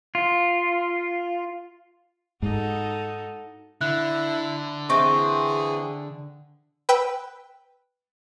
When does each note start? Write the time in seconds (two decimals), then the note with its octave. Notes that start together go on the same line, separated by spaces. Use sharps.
0.15 F4
2.42 G#2 D#4 F#4 A4
3.81 D3 E4 F#6
4.90 E3 C4 G#4 G5 C#6
6.89 B4 G5 E6 B6